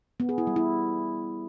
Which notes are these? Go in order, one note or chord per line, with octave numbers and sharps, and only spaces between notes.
B3
G#4
E4
G3
E4